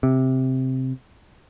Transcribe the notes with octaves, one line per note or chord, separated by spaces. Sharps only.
C3